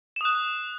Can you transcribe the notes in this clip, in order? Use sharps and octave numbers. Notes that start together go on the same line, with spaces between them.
D#6 F#6 E7